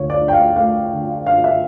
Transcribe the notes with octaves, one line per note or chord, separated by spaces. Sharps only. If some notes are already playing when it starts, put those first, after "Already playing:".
Already playing: D2 C#5
D5
D4
G5
F5
A3 F5
D3
D4 F5
E5